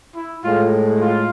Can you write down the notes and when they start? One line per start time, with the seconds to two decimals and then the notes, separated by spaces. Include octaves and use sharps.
0.15 E4
0.44 A2 G#3 F4
1.01 F4